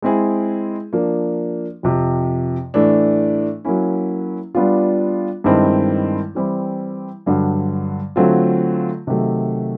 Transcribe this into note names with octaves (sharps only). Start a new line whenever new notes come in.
G#3 C4 E4 G#4
F3 A#3 D4
F2 C3 F3
A2 E3 A3 D4
F#3 A#3 C#4 E4
G3 B3 D4 F4
G2 D#3 G#3 C4 E4
E3 G3 C4 E4
G2 D3 F#3
D3 F#3 A3 C4 F4
C3 D#3 F#3 A3